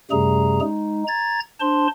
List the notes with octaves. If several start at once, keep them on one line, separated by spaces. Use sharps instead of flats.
F#2 C3 G3 A3 G#4 A#5
G#3 D#4
A#5 G#6 A6
D4 C5 A5 C6